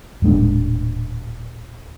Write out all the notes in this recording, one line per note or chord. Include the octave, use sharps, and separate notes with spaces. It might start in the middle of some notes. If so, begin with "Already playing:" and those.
D#1 A2 G#3 D4